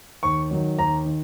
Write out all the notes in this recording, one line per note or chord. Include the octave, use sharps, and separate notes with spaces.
D#2 C#6
D#3 F#3
D#2 A#5
D#3